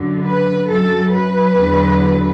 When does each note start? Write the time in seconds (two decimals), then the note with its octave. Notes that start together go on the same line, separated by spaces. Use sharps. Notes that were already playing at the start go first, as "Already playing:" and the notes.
Already playing: F#2 D3 F#3
0.24 B4
0.68 F#2 F#3 A4
1.13 B4
1.56 E2 D3 F#3